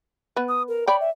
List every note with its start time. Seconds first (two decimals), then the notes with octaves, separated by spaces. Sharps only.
0.36 B3 B4
0.48 D#6
0.68 A#4
0.87 C#5 D5 G5 B5
1.00 E5